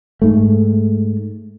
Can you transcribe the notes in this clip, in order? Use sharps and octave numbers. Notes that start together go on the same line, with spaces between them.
G#2 A3